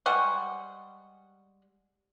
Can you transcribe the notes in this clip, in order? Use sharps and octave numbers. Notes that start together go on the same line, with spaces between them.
G3 G#3 F#5 C#6